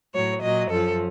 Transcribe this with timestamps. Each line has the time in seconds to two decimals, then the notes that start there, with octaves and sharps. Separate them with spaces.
0.14 A2 F#3 C#5
0.42 A#2 F#3 D#5
0.71 F#2 F3 A4